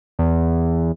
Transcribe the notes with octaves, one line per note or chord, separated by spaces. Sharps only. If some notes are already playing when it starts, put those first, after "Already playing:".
E2